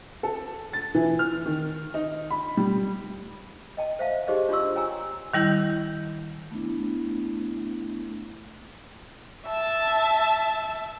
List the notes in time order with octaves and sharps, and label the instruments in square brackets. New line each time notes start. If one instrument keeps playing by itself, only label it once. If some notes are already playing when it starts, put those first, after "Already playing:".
[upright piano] A4
A6
E3
F6
D#3
D#4
B5
G3
[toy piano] D#5 G5 A5
C5 E5 F5 A5
D#4 G4 G#4 C5 D5 D#5
D4 F4 D5 C6 C#6 E6
C#5 G5 G#5 A#5 E6
[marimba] D#3 G3 E4 G6
[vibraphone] A3 B3 D4 E4
[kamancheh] E5 A5